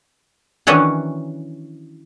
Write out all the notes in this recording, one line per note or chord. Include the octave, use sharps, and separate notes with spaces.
D#3 E3 F#3 C#4 D4